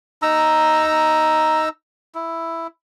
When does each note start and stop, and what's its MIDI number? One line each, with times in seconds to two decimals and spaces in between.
0.22 1.69 63
0.22 1.69 82
0.22 1.69 88
2.15 2.67 64